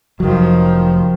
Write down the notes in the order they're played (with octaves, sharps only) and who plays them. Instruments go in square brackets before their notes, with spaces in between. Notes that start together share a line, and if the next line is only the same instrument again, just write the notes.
[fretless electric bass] F1 F#3 [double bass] D#3 F3